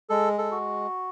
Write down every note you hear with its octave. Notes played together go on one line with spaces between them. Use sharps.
G#3 A4
A4
F#4